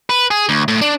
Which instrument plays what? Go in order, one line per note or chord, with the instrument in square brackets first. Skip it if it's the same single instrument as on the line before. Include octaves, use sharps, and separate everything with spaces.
[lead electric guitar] B4
G#4
D2
A2
D4